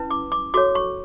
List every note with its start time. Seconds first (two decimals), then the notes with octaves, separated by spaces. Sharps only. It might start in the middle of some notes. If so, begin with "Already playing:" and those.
Already playing: C#4 E4 B4
0.11 D6
0.32 D6
0.54 F#4 A4 C#5 D6
0.75 C#6